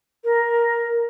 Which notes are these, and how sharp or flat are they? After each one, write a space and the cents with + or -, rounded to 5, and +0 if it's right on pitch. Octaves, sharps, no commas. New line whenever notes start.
A#4 +10